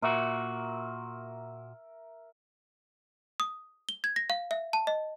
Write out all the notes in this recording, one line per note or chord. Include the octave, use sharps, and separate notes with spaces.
A#2 F#4 A#4 E5
D#6
G7
G#6
A#6
F5
E5
A5
D#5